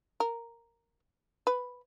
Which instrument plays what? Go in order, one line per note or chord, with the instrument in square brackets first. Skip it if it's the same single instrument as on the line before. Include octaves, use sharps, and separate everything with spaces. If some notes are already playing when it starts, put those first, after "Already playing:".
[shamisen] A#4
B4